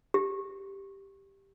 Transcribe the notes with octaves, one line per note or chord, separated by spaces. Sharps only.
G4